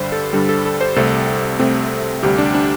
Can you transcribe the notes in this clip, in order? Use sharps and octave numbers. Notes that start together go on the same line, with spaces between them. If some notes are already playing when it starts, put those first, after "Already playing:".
Already playing: G2 D3 G3 C5
A4
G2 D3 G3
A4
A4
C5
C2 C3 A3 C4 A4
C2 C3 A3 C4
D2 C3 G3 G4
D4
D4